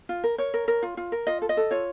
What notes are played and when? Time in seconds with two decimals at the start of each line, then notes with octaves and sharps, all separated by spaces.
0.09 F4
0.24 A#4
0.38 A#4 C#5
0.54 A#4
0.68 A#4
0.83 F4
0.97 F4
1.12 A#4
1.27 F4 D#5
1.42 A4
1.49 D#5
1.57 A4
1.71 F4 C#5